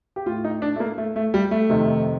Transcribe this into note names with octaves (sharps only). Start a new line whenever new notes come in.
G4
A2 F4
D#4
D4
A3
A#3
A3
A3
G3
A3
F2 C3 D#3